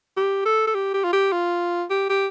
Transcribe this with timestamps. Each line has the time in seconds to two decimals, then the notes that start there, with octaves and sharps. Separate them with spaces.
0.17 G4
0.45 A4
0.67 A4
0.74 G4
0.94 G4
1.04 F4
1.13 G4
1.32 F4
1.90 G4
2.10 G4